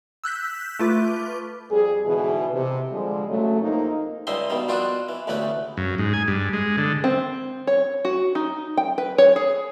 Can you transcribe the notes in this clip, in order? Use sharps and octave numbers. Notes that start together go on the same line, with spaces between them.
E6 F#6 G6 B6
A3 F4 B4 D6
F2 G3 G#4
G#2 B2 D3 E3
C3
D3 F3 G3 G#3
C#3 F#3 A3
F2 A#3 D#4
C#2 G#2 G3 D#5 E5 C6
G2 B2 D#3 G3
B2 F3 C4 D4 F4 F#4
E3
A1 D2 C#3 E3 A3 B4
F#2
G#2
G#5
G2
G#3
D3
C4
C#5
F#4
D#4
G5
B4
C#5
G#4